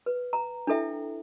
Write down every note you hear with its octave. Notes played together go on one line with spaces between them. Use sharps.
B4
A#5
D4 E4 A4 E5 G5